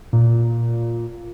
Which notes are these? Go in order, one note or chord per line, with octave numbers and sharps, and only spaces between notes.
A#2